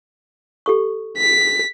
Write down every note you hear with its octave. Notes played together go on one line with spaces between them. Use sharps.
G4 A4 C#6
B6